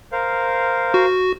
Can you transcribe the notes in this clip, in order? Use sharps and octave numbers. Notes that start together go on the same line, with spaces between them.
A#4 C5 F5
F#4